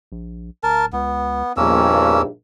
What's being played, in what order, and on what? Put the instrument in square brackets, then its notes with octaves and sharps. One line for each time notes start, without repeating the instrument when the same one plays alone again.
[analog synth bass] A#1
[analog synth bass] D1 [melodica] A#4 A5
[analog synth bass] C#2 [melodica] B3
[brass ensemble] A#1 G2 D#4 [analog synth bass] E2 [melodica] A#3 C#4 E6